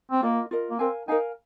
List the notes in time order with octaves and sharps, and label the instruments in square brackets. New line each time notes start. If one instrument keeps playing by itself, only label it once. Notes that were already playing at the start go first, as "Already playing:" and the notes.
[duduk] C4
[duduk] A#3 [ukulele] F4 A#4 D#5
[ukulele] F4 A#4 D#5
[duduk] A#3
[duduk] C4 [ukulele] A#4 F5 G#5
[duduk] D#4 [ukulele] A#4 F5 G#5